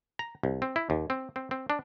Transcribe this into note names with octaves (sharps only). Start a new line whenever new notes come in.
A#5
C2
C4
E4
D#2
C4
C4
C4
D4